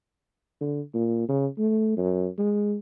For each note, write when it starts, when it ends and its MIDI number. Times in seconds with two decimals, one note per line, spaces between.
0.61 0.81 50
0.94 1.26 46
1.29 1.47 49
1.58 1.94 57
1.97 2.27 42
2.38 2.76 56